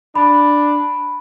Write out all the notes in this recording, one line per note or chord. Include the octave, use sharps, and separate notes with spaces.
D4 B5